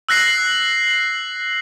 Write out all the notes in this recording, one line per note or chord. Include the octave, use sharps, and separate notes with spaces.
E6 F#6 A#6 C7 F#7